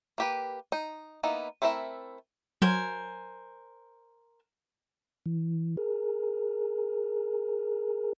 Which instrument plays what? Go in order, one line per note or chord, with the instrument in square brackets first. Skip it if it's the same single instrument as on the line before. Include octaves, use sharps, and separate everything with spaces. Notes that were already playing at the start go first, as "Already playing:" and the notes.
[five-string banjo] A#3 G4 B4
D#4
A#3 B3 D#4 E4
A3 C4 E4 A#4 E5
[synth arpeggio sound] F#3 [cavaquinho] A#4 C5 G#5
[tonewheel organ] E3
G#4 A#4